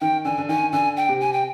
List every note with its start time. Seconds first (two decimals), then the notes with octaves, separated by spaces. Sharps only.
0.01 D#3 G5
0.25 D3 G#5
0.38 D3
0.49 D#3 G#5
0.72 D3 G#5
0.97 G5
1.09 C3
1.20 G#5
1.33 G5